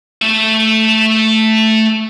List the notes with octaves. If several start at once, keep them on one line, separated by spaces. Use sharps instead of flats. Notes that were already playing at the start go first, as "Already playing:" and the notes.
A3 E5